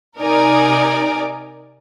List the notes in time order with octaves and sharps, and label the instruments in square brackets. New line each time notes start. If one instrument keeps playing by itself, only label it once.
[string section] C3 D#4 A#4 D5 G#5 D6